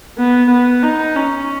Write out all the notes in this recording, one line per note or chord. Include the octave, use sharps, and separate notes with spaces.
B3
B3
D#4
C#4